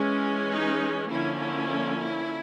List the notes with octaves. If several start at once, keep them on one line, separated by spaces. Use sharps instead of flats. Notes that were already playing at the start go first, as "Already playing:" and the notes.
Already playing: E3 G#3 C#4
D#4
D3 F3 A#3 C#4 E4
E4
E4